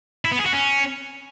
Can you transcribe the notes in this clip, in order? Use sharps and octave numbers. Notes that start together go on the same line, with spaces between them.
E4
B3
G#4
F#4
C#4